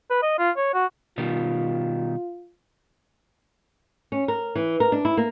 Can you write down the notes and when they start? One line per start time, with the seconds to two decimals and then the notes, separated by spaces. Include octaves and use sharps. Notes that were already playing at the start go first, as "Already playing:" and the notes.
0.10 B4
0.22 D#5
0.39 F4
0.57 C#5
0.74 F#4
1.18 B2 D#3 G3 F4
4.12 C#4
4.28 A#4
4.55 E3
4.80 A#4
4.92 D4
5.05 E4
5.17 A#3